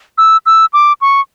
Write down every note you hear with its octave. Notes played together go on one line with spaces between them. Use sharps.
E6
E6
D6
C#6